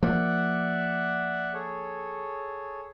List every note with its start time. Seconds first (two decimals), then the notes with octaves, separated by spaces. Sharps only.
0.03 F3 A#3 D5 E5 F#5
1.54 G#4 A4 C#5